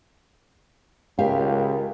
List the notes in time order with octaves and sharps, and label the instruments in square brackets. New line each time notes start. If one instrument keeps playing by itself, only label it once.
[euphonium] C#2 [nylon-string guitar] G4 E5 F5 [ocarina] A#4